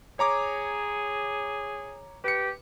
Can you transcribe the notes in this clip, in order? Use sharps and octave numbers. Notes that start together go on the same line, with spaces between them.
G#4 C#5 A#5 D6
G4 B4 C#7